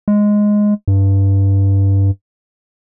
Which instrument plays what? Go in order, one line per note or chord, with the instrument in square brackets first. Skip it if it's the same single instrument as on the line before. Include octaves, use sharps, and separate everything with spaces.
[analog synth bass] G#3
G2